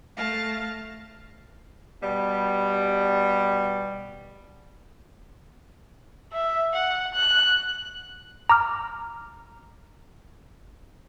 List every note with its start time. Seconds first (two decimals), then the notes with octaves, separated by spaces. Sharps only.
0.17 A3 F5 A5 A#6
2.02 B2 G3
6.33 E5
6.73 F#5
7.14 F#6
8.50 A#5 D6 F6